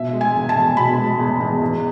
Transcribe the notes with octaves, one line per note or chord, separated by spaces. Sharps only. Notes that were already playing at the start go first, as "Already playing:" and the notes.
Already playing: B2 E5
G#3
G#5
E2
A5
E2
B2 B5
G#3
E2
E2
E2